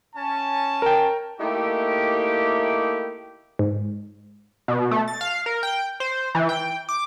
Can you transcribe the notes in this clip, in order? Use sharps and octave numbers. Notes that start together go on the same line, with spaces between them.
C#4 A5
A#4 G5
A3 A#3 D#4 E4 G4
G#2
B2
A3
A6
F5
A#4
G5
C5
E3
G5
D6